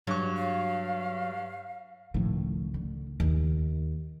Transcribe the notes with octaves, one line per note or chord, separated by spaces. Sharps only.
G2 F#3 C#6
F5
C#2 A2 D#3 F3
D3
D#2